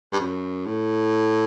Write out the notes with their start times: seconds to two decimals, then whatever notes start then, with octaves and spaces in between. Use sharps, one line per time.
0.12 G2
0.20 F#2
0.66 A2